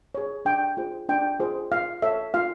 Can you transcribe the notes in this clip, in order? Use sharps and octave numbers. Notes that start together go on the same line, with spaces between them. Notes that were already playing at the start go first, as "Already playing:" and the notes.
G#4 C#5
D4 G5
F4 G#4 C5
D4 G5
F4 G#4 C5
F4 F5
A4 C#5 E5
F4 F5